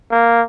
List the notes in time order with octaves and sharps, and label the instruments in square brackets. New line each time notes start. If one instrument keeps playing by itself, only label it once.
[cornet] A#3